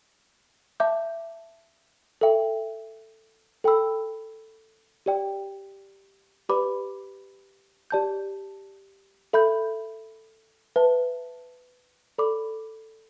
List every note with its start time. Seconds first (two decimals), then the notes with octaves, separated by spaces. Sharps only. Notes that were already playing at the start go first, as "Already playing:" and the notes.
0.80 E5 A5 D6 G6
2.21 A4 E5 G5
3.64 A4 G5 B5 E6
5.06 G4 D5 G5
6.49 G4 B4 D5 B5 D6
7.90 G4 D5 A5 G6
9.33 A4 E5 B5 G6
10.76 B4 E5 A5
12.18 A4 D5 B5 D6